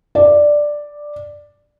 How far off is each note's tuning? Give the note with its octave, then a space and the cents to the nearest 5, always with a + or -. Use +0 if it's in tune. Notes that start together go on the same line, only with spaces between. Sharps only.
D5 +5